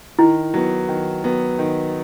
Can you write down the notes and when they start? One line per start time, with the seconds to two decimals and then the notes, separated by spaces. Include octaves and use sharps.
0.19 D#3 E4
0.54 F#3 B3
0.89 D#3
1.24 F#3 B3
1.59 D#3